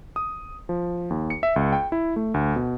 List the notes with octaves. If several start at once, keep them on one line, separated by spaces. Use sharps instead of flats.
D#6
F3
D#2
C#7
E5
C#2
G5
E4
A3
D2
B2